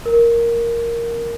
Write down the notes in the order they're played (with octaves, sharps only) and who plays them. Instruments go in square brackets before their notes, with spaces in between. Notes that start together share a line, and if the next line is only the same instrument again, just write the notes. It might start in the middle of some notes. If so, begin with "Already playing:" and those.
[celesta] A#4